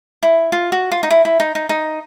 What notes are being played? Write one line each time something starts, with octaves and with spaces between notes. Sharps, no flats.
E4
F4
F#4
F4
D#4
E4
E4
D#4
D#4
D#4